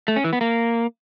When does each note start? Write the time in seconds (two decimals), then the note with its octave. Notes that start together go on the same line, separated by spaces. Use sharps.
0.08 A3
0.16 C#4
0.24 E3
0.33 B3
0.41 A#3